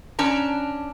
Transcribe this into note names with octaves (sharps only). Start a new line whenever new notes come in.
C#4 D4 A#5